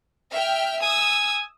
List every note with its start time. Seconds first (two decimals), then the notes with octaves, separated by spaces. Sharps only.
0.32 E5 G5 F6
0.82 G#5 D#6 E6